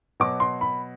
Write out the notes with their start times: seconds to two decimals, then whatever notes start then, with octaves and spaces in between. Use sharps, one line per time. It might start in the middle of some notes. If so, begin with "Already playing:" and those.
0.20 B2 F#3 D6
0.40 C6
0.61 B5